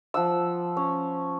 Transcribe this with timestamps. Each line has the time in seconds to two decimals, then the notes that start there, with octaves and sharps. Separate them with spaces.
0.14 F3 F#5 E6
0.77 C#4